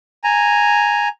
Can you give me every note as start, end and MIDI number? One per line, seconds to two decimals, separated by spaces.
0.24 1.08 80
0.24 1.08 82